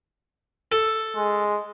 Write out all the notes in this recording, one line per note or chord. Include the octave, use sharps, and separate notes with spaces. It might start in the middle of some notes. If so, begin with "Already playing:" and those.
A4
G#3